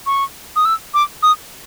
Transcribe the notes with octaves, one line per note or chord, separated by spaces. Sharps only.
C#6
D#6
E6
D6
D#6